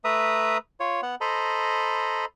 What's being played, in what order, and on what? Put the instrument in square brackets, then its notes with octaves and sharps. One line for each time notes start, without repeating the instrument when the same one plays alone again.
[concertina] A3 B4 E5 A#5 D#6
F4 C#5
B3 F#5
A4 C5 D#5 A#5 B5